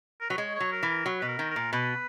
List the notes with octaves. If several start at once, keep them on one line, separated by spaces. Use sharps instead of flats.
A#4
F#3 B4
G#3 C#5
C#5
F#3
A#4
E3
A#4
F#3
B2 B4
A#4
D#3
A#4
A#2
B2 B4